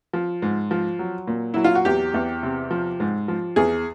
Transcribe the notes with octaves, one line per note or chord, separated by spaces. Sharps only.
F3
G#2
F3
F#3
A#2
F#3 E4
F4
F#4
E2 G4
E2
C3
F3
G#2
F3
E2 G#4